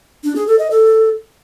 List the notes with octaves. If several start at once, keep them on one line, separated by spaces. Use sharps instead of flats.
D4
G#4
A4
D#5
A4